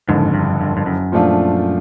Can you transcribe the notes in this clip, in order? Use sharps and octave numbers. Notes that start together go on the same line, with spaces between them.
F#1 F2 G#2 D3
G2
G2
G2
F#2
A#2 F3 A3 D4 F4